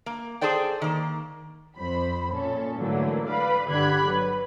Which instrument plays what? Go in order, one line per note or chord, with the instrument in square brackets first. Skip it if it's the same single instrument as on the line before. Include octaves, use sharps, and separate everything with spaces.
[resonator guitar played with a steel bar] A#3
G#4 A4 C5 D5 G5
D#3 A#3
[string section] F2 C5 B5
A#2 C#4 A4
G#2 D3 E3 F#3 A3 A#3
B4 D5 F5 B5
G1 D3 G4 B5 F#6 G#6
F#3 B4